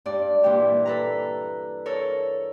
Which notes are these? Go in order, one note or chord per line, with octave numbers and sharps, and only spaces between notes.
G2 D5
A#2 E3 G3 G4
A4 B4 A#5
A4 A#4 C#5